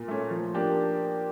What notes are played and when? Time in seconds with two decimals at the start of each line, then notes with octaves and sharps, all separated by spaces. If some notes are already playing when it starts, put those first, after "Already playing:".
Already playing: A#2
0.08 A3 C#4
0.30 F3
0.54 A#3 D4 G4